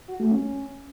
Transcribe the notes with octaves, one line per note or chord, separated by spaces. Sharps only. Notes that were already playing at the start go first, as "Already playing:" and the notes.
F#4
A3
C#4